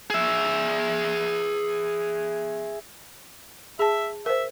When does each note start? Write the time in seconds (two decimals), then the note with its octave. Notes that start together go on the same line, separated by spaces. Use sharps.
0.10 G#4 E5
3.79 G#4 E5 A5
4.26 A#4 C5 E5